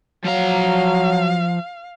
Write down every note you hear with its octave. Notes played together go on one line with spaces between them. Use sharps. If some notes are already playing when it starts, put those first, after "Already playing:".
F3 F#3 F5 A#5